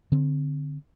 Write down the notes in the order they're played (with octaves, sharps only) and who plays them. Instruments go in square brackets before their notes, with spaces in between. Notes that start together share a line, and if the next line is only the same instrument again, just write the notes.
[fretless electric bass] D3 C4